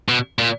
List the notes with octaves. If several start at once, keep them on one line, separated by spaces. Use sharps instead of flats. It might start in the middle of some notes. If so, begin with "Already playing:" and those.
B2
A#2